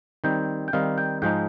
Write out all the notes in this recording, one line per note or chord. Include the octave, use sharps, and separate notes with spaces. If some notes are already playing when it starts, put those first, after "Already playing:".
D#3 G3 C4 D#4 G5
G5
D#3 G3 C4 D#4 F5
G5
G#2 F3 G#3 D#4 G5